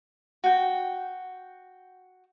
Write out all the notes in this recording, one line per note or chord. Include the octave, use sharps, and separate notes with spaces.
F#4 G5